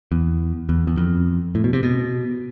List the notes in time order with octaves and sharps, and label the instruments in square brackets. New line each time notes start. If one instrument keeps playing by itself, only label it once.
[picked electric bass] E2
E2
E2
F2
A2
B2
C3
B2